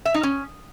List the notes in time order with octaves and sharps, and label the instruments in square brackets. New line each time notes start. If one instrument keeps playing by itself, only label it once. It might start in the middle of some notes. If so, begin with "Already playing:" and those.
[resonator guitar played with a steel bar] E5
D#4
C#4